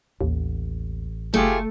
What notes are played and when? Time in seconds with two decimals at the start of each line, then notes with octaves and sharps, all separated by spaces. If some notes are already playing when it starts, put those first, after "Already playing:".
0.21 A1 D#2
1.34 F#1 A3 F4 G4 G#4